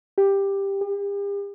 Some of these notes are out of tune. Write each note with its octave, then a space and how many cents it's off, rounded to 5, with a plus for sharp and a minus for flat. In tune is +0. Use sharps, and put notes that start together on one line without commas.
G4 +10
G4 +40